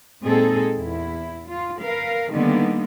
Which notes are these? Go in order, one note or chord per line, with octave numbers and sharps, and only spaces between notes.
A#2 G#3 C4 D#4 G#4 A4
E2 E4
F4
A#4 B4 F5
D3 D#3 G3 A#3 B3 D#4